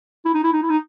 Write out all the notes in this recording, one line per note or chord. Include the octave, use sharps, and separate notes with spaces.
E4
D#4
E4
D#4
E4
D#4